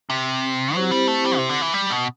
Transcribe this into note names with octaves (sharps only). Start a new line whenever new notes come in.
C3
F#3 C4 E4 G4 C5
G3
A3
G3
C3
D3
E3
G3
B2